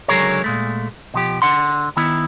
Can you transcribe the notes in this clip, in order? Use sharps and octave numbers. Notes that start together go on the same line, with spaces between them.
C#2 D3 F#3 G#4 A#4 C#5
A#2 G#3 A3
B2 F3 G4
D3 F#5 C6
D#3 B3 E4